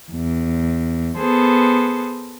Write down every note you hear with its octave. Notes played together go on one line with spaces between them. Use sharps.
E2
B3 G#4 A4 C5